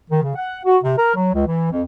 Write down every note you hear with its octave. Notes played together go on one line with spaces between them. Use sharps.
D#3
C#3
F#5
F#4
C3
A#4
F#3
C#2
E3
F2